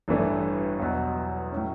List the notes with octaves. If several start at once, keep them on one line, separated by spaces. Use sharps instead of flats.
A1 G2 E3 A3 D4
E2 B2 F#3
A2 F#3 C#4